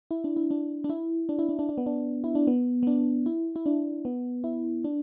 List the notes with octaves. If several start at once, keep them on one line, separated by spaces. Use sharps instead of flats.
E4
D4
E4
D4
D4
E4
D4
E4
D4
D4
D4
B3
D4
E4
D4
B3
B3
D4
E4
E4
D4
B3
E4
D4